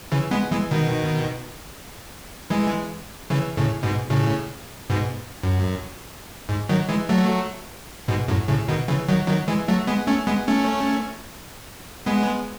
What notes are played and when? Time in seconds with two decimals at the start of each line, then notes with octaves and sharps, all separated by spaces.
0.12 C#3 E3
0.31 G#3 B3
0.51 E3 G#3
0.71 B2 D#3
2.50 E3 G#3
3.30 C#3 E3
3.57 A2 C#3
3.83 G#2 B2
4.10 A2 C#3
4.90 G#2 B2
5.43 F#2
6.49 G#2
6.69 D#3 F#3
6.89 E3 G#3
7.09 F#3 A3
8.08 G#2 B2
8.28 F#2 A2
8.48 A2 C#3
8.68 B2 D#3
8.88 C#3 E3
9.09 D#3 F#3
9.28 D#3 F#3
9.48 E3 G#3
9.68 F#3 A3
9.87 G#3 B3
10.07 A3 C#4
10.27 G#3 B3
10.48 A3 C#4
12.06 G#3 B3